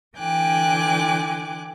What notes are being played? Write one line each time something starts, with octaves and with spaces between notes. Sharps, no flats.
D3 E3 G5 G#5 D6 F#6